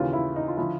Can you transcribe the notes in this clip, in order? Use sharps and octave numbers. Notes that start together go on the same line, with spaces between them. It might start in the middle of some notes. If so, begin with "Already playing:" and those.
Already playing: D#2 C#3 E3 F4
E4
D#4
F4
D3 F3 E4